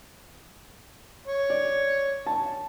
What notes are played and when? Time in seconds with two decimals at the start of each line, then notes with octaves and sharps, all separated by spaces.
1.27 C#5
1.50 D5
2.26 A5